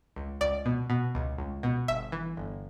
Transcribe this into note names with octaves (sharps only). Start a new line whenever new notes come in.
C#2
C#2 D5
B2
B2
C#2
C#2
B2
G1 E5
E3
G1